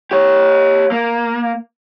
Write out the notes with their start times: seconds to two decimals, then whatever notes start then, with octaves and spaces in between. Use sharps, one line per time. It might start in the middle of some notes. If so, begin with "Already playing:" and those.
0.11 G4 C#5
0.92 A#3